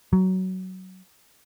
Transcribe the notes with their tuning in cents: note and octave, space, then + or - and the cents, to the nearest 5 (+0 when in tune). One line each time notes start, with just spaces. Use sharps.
F#3 +15